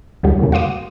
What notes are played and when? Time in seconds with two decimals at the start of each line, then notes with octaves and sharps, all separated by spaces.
0.23 D2 A2 D3 F#3 G3
0.39 E2 A#2 C#3
0.52 F#4 F5 C6 D6 D#6